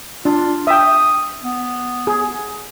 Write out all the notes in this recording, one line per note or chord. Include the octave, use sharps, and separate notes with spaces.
D4 F4
E5 G5 D#6
B3
G#4